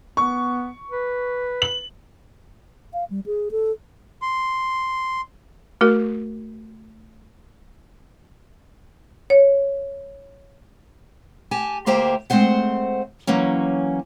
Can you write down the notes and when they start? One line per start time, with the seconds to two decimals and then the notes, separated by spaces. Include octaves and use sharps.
0.17 B3 C#6
0.91 B4
1.62 F#7
2.93 F5
3.10 G3
3.26 G#4
3.51 A4
4.22 C6
5.81 A3 F#4 A#4
9.30 C#5
11.51 G4 G#5 A5
11.86 D2 A#3 G4 C5 E5 G5
12.30 G#3 A3 C4 C5 F#5
13.27 E3 F#3 A#3 C#4